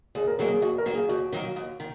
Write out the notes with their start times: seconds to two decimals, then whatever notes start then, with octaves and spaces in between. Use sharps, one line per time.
0.15 D#2 G#4
0.27 A#4
0.39 D#3 F#3 A#3 G#4
0.50 G#4
0.62 D#2 F#4
0.78 A#4
0.86 D#3 F#3 A#3
0.93 G#4
1.09 D#2 F#4
1.33 D#3 F#3 A#3
1.56 D#2
1.80 D#3